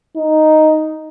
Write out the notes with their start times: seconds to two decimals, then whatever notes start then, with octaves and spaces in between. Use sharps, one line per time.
0.17 D#4